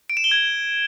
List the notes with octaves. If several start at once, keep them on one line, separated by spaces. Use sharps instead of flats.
D7
E7
G7
G#6